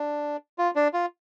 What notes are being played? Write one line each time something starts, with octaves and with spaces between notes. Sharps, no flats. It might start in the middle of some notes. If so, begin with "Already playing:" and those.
Already playing: D4
F4
D4
F4